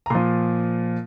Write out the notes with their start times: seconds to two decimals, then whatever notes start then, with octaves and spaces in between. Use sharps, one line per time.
0.06 A#5
0.10 A#2 F3 C6